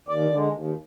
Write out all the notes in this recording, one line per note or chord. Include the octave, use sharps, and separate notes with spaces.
D#2 D5
D3
G#3
D#2